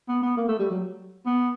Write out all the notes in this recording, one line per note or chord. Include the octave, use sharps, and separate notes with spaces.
B3
B3
A#3
A3
G3
F#3
B3